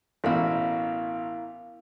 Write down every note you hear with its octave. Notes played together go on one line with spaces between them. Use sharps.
A1 B2 E4 A#4 F5